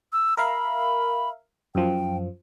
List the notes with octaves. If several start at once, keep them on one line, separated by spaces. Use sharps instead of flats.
E6
A#4 E5 F5 B5
F#2 F3 G5